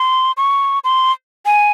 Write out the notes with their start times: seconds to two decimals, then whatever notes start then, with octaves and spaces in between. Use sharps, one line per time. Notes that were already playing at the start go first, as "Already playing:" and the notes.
Already playing: C6
0.37 C#6
0.84 C6
1.46 G#5